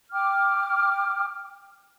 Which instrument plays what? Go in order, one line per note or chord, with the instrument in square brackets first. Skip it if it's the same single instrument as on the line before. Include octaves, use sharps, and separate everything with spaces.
[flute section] G5 D6 F6